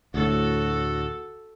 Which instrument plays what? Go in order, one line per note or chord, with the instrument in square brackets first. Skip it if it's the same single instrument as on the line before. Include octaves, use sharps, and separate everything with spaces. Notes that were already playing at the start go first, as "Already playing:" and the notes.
[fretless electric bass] D2 A2 [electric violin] F#4 A4